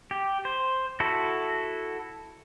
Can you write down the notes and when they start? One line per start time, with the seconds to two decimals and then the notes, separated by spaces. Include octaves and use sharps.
0.11 G4
0.45 C5
1.00 E4 F#4 A4